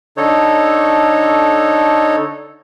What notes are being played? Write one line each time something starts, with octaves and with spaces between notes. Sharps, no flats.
D3 D#4 A4 C#5